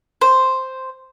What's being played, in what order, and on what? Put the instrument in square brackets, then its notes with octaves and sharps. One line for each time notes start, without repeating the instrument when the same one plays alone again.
[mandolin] C5